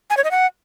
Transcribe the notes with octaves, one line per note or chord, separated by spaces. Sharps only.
G#5
C#5
D#5
F#5